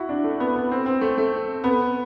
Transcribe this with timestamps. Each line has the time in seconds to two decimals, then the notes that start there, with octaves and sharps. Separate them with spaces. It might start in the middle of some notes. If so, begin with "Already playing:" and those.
Already playing: E4 F#4
0.09 D4
0.24 A3
0.40 B3
0.56 B3
0.71 C4
0.86 C4
1.01 A3
1.18 A3
1.64 B3